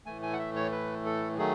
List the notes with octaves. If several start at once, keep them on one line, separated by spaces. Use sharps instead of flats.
A2 E3 A3 G#5
G#5
F#5
E5
C#5
B4
A4
D#3 F#3 A3 G#4